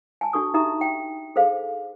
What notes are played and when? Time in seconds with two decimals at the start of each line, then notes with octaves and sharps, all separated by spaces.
0.21 G#5 A5
0.33 D4 F#4 A4 C#6 D#6
0.54 D#4 G4 E5 A#5 D#6
0.81 G5
1.36 G#4 A4 C5 F5